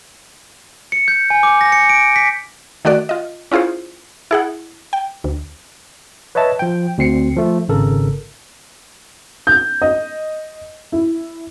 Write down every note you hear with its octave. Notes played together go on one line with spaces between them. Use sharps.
C#7
G6
G#5
D6
A#6
C#7
D7
B6
D#3 A3 F#4 D5
F4 D#5
C#4 E4 F4 G#4 C5
E4 G#4 F#5
G5
D2
B4 C#5 D#5 E5 A5
F3 G5
D2 C4 C7 C#7
F3 A3
G#1 C#3 A4 A#4
G6
D#5
E4